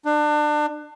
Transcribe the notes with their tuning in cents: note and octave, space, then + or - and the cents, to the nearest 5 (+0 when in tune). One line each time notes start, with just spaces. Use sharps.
D4 +30